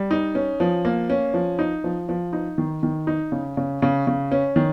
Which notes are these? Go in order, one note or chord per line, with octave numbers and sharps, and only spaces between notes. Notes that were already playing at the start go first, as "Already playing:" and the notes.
Already playing: G3
D#4
C#4
F3
A#3
C#4
F3
D#4
F3
F3
D#4
D#3
D#3
D#4
C#3
C#3
C#3
C#3
C#4
D#3